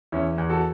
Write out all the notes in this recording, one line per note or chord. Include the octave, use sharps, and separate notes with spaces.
E2 C#4 E4
E2
F#4 A4